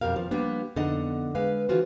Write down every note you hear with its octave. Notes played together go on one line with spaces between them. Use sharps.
F2 B2 G4 A#4 F5
F3
F3 G3 A#3 B3 D4
F2 D3 B3 D#4 D#5 F#5
G#3 B4 F5
D3 E3 F4 F#4 C5